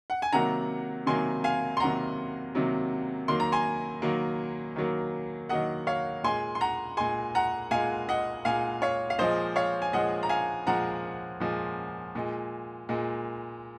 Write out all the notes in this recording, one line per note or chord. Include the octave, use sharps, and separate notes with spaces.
F#5
G#5
C3 D#3 F#3 A#3 F#5 A#5
C3 D#3 F#3 A#3 G#5 C6
F5 G#5
C6
C3 D#3 F#3 A#3 F#5 A#5
C3 D#3 F#3 A#3
D#3 F#3 A#3 C6
A#5
G#5 C6
D#3 F#3 A#3
D#3 F#3 A#3
D#3 F#3 A#3 D#5 F#5
C#5 F5
A#2 G#3 G#5 C6
C6
F#5 A#5
A#2 G#3 G#5 C6
F#5 A#5
A#2 G#3 F5 G#5
D#5 F#5
A#2 G#3 F5 G#5
C#5 F5
F5
A#2 F3 G#3 C5 D#5
C#5 F5
G#5
A#2 F3 G#3 D#5 F#5
A#5
F5 G#5
A#2 F3 G#3 F#5 A#5
A#2 F3 G#3
A#2 G#3
A#2 G#3